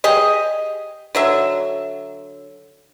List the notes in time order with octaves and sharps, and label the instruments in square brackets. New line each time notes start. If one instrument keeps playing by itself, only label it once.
[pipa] G4 G#4 D#5
D3 F#3 E5